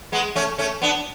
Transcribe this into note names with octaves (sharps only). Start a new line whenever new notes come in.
G#3 B3
A3 C#4
A3 C#4
B3 D4